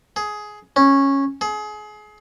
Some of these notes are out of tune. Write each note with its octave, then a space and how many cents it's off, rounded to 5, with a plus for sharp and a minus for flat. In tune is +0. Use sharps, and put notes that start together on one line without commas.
G#4 +15
C#4 -10
G#4 +30